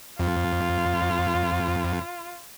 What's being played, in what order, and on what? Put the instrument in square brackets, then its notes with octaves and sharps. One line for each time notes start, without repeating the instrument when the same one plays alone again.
[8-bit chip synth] F2 [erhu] F4